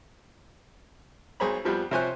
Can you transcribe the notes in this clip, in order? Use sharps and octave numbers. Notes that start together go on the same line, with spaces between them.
B1 G#4 C5 C#5 A#5 B5
F2 F3 G3 B3
C3 F3 C5 C#5 G#5 F#6